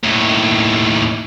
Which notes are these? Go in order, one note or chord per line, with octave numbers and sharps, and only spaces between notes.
D#2 A2